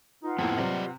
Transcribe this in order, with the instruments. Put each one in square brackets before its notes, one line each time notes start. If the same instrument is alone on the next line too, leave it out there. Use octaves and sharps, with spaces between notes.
[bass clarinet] D#4 [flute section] F4 B4 F#5
[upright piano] F2 A2 [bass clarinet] A#3 [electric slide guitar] B3 G#4 A4
[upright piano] C3 [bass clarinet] F#3 [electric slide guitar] G4 D5 D#5